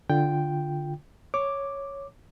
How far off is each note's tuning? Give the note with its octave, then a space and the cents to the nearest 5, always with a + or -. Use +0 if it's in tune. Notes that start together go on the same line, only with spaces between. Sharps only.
D3 +0 F4 +0 G5 +0
C#5 +0 D6 +0